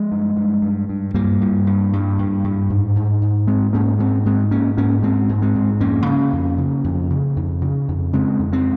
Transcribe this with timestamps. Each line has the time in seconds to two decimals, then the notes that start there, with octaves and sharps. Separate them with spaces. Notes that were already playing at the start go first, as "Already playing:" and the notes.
Already playing: F3 G#3
0.12 G2
0.37 G2
0.62 G2
0.89 G2
1.14 G2 G3 A#3
1.41 G2
1.67 G2
1.93 G2
2.19 G2
2.44 G2
2.70 G#2
2.96 G#2
3.22 G#2
3.47 G#2 G#3 C4
3.73 G#2 A#3 C#4
3.99 G#2 G#3 C4
4.26 G#2 G#3 C4
4.51 G#2 A#3 C#4
4.77 G#2 A#3 C#4
5.02 G#2 G#3 C4
5.29 G#2
5.42 G#3 C4
5.55 G#2
5.80 F2 A#3 C#4
6.06 C#3
6.33 F2
6.58 C#3
6.84 F2
7.10 C#3
7.36 F2
7.62 C#3
7.88 F2
8.13 C#3 G#3 C4
8.39 F2
8.52 G#3 C4